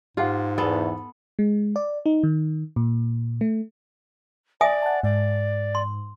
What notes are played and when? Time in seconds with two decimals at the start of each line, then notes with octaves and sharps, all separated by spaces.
0.17 G#2 F4 G4 F5 F#5
0.58 E2 B3 A4
1.39 G#3
1.76 D5
2.06 D#4
2.23 D#3
2.76 A#2
3.41 A3
4.61 D5 E5 G#5 D#6
4.82 F#5 A5
5.03 G#2 D5
5.75 C6